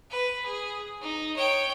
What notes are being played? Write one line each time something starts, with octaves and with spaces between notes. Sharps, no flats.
B4
G#4
D#4
C#5 G5